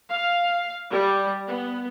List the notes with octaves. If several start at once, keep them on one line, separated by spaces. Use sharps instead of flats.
F5
G3
B3